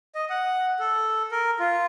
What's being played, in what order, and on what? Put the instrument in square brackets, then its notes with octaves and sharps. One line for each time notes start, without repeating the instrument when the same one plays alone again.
[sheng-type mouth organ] D#5
F#5
A4
A#4
F4